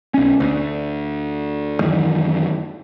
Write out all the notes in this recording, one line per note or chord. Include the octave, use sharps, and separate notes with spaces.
B1 C#4
D2
F#2 D#3 E3